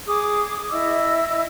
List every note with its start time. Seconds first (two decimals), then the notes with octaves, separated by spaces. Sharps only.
0.08 G#4 D6 D#6
0.72 E4 D#5 E5 E6